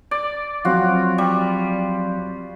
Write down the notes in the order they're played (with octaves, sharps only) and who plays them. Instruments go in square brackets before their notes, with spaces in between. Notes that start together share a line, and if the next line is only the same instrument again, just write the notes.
[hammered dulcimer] D5
[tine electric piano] F3 F#3 C4 [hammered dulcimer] F4 F#4
[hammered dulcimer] G3